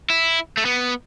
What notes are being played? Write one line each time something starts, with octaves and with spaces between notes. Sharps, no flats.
E4
A3
B3